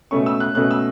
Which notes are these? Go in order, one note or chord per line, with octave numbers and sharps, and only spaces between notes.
B2 A3 C#4 C#6
E6
F#6
B2 A3 C#4 F#6
E6